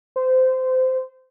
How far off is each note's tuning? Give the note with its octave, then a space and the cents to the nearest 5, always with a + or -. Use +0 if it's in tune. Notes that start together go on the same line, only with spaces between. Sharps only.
C5 -20